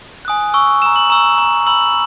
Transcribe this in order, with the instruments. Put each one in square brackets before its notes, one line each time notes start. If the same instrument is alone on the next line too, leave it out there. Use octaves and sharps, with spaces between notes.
[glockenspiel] G#5 D#6 F#6
G#5 C#6 E6
E6 E7
A#5
F#7
A#5 C#6 E6 E7
A#5 E6
B5 E6 F#7